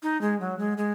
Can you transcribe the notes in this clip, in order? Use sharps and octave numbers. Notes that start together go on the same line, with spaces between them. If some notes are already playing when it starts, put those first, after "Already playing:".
D#4
G#3
F#3
G#3
G#3